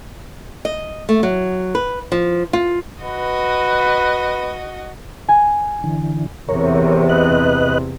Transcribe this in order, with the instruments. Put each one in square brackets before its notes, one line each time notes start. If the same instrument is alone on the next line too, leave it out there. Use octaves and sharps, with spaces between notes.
[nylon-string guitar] D#5
A3
F#3
B4
F3
F4
[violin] F#4 D#5 [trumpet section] B4
[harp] G#5
[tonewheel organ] D3 E3
[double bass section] E2 C3 [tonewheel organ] A#4 C#5
[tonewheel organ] B4 D#5 F#6